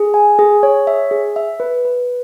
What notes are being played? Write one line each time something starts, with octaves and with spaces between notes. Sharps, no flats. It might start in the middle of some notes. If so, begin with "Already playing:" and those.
Already playing: G#4
G#5
G#4
C#5
E5
G#4
E5
B4
B4